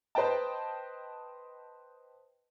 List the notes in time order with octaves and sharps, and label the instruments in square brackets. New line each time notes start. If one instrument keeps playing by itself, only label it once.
[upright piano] B4 C5 D#5 G5 A5